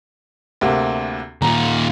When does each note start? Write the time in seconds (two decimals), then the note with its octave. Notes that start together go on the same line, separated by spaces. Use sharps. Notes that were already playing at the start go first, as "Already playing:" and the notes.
0.61 D2 C3 A#3
1.42 D#2 A#2 A#5